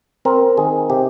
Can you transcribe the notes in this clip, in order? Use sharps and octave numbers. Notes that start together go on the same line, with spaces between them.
C4 A#4
D#3 G#4
C3 G4